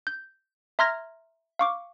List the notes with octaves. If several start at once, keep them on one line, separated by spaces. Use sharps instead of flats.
G6
E5 A#5 C6 F6 G#6 A#6
F5 C#6 D6